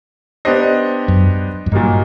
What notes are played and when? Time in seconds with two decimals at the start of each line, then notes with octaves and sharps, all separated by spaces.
0.45 B3 D4 G4 C5 D#5
1.08 F#2
1.66 F#2
1.72 G2 A#2 F#3 A#3 D#4